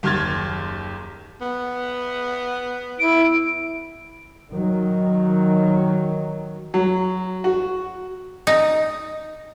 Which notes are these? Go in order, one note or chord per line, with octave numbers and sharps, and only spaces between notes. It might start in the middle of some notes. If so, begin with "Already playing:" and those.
F#1 D#2 C6 F6 G#6 A6
B3
E4 D7
D#3 F#3
F#3
F#4
D#4